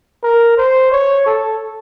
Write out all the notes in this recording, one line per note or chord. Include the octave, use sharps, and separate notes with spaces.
A#4
C5
C#5
A4